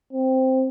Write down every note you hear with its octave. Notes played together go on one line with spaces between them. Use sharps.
C4